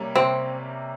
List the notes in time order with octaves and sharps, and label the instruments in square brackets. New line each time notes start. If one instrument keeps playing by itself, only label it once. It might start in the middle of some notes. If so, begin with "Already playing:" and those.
Already playing: [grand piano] C3 G3 A#3 C#4
[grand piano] C3 [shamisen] C4